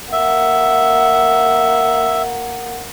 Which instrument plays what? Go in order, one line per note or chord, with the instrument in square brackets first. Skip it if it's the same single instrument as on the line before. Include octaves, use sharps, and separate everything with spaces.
[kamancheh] A#3 F#5 [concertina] E5